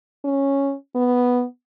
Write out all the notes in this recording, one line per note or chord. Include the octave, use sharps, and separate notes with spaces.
C#4
B3